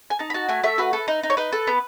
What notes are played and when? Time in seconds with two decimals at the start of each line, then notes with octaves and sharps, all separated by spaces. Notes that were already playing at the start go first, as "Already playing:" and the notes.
0.10 G#5
0.19 D#4 A5
0.30 B5
0.34 F#4 A5
0.49 A3 G#5
0.63 A3 E5
0.78 F#4 B4
0.93 A4
1.08 D#4
1.23 D#4
1.30 C#5
1.37 D#4 B4
1.52 A4
1.67 B3